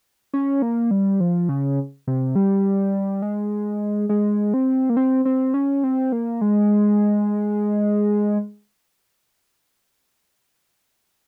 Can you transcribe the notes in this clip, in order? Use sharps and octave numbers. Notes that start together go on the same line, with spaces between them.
C#4
A#3
G3
F3
C#3
C3
G3
G#3
G#3
C4
A#3
C4
C4
C#4
C4
A#3
G#3